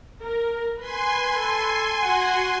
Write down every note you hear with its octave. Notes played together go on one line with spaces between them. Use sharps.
A#4
B4 G#5 C6
A4
F#4 F#5